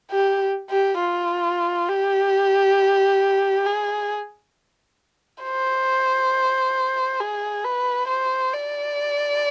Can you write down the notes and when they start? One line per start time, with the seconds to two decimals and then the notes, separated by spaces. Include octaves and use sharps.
0.11 G4
0.70 G4
1.00 F4
1.89 G4
3.66 G#4
5.43 C5
7.20 G#4
7.65 B4
8.08 C5
8.53 D5